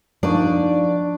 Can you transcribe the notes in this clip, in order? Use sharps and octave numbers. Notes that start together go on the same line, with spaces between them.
F3 A#3 D4 D#4 D5 C#6